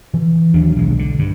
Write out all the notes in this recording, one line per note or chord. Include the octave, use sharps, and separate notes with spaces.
E3
D#2 D#3 F#3 D4
B1 D#3 G#3
D3
G2